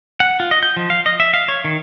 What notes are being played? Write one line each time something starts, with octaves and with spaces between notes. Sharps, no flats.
F#5
F4
D#5
G6
F3
F5
D#5
E5
F5
C#5
D#3